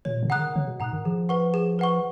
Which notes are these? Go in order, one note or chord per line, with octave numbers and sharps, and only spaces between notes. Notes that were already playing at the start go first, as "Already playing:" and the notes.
A#2 C#5
C#3
F#5 A#5 D#6 F#6
D#3
C#3 C#5
B2
G#2 F#5 A#5 D#6 F#6
D#3
F3 G#4
B4 F#5 C#6
G#4
B4 F#5 C#6